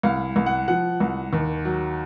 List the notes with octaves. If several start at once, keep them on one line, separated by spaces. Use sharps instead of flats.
C2 F5
C2
F#5
F3 F#5
C2
D#2
F#3